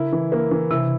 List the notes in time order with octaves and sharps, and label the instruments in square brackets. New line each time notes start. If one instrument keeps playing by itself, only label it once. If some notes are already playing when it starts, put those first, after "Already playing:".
Already playing: [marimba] C#3 [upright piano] E4 A#4
[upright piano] E3
A#3
E3
[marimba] C3 [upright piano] E4